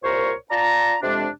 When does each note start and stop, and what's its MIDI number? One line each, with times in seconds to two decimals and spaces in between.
0.03 0.33 36
0.03 0.33 46
0.03 0.33 70
0.03 0.33 72
0.03 0.33 73
0.03 0.33 85
0.51 0.96 65
0.51 0.96 74
0.51 0.96 81
0.51 0.96 82
1.03 1.27 41
1.03 1.27 48
1.03 1.27 56
1.03 1.27 62